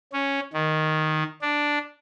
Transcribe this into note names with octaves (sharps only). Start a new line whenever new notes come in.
C#4
D#3
D4